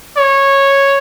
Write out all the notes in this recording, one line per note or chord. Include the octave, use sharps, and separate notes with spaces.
C#5